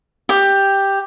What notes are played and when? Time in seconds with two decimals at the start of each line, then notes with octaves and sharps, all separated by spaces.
0.29 G4